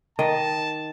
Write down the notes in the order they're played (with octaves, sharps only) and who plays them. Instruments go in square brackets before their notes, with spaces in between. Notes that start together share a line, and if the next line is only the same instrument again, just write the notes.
[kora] D#3 D#5 [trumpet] A5